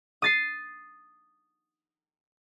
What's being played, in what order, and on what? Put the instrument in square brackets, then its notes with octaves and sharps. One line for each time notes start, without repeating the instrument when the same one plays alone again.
[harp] D#6 A6 C7